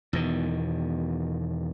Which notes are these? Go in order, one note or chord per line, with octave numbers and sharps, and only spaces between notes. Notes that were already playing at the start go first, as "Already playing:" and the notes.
E2 B2 D#3